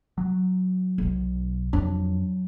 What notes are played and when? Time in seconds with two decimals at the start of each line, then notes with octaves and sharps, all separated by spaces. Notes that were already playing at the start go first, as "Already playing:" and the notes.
0.18 F#3
0.98 B1 B2
1.73 F2 F#3 D4